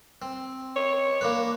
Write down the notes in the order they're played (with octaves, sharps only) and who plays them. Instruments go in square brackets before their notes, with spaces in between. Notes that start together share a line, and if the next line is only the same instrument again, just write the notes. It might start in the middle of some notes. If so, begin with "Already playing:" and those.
[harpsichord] C4
[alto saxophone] C#5
[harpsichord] A#3 D4 B4